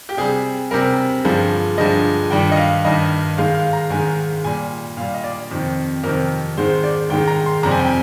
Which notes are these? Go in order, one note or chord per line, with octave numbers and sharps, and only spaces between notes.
G4
C3 G3 G#4
C3 G3 A#4
G2 D3 F3 G#3
G2 D3 F3 G#3 D#5
G2 D#3 G3 G5
D#5
F5
G2 D#3 G3 D#5
G#2 D#3 G#3 F5
F5
A#5
G#2 D#3 G#3 G#5
A#2 G3 G#5
A#2 G3 F5
D#5
D5
F2 C3 D#3
F2 C3 D#3 A#4
G#2 D#3 G#3 C5
D5
G#2 D#3 G#3 G5
A#5
C6
F2 C3 G3 A#5
G#5
G5
G#5